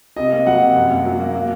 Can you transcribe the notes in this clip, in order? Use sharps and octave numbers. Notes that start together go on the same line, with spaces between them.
C3 D#5
A#3
F#3 F#5
C3
F#2
A#3
F#3
A#3
A#3